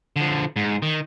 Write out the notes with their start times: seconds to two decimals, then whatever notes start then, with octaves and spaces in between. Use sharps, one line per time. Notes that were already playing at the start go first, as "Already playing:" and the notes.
0.16 D3 F3
0.56 G#2
0.82 D#3